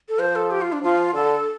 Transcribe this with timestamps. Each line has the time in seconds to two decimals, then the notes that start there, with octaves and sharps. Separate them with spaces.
0.09 A4
0.19 F3 C5
0.36 A4
0.51 G4
0.61 F4
0.72 D4
0.83 F3 F4
1.14 D3 A4